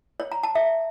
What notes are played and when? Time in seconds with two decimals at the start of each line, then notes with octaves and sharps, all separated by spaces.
0.20 C#5
0.32 A#5
0.43 A5
0.55 E5